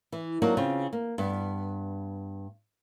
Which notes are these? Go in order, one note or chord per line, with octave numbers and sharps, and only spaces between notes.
E3
F#3 A#3 D4 D#4 F#4
C#3 C4 F4
A#3
G2 B3